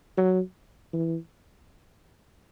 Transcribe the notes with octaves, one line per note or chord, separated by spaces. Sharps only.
F#3
E3